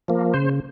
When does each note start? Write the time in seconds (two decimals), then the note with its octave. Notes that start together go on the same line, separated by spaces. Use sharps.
0.08 F3 A#3
0.34 C#3 C5